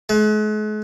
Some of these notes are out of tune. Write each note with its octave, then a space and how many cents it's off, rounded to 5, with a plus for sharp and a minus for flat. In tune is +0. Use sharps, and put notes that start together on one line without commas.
G#3 +45